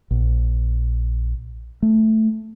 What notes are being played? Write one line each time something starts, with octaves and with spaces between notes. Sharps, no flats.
A#1
A3